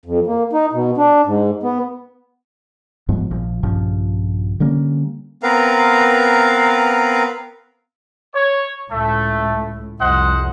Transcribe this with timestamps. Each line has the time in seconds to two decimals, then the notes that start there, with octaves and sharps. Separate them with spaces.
0.05 F2
0.27 A#3
0.53 D#4
0.73 B2
0.98 D4
1.26 G#2
1.63 B3
3.09 G#2 F3 G3 B3
3.31 A#1 F3
3.63 A#1 G2 C#3 F3
4.60 D3 G3 A#3 C#4
5.43 B3 C4 A#4 B4 F5 A#5
8.34 C#5
8.91 C#2 A2 A3
10.00 C2 F2 C5 D#5 F#5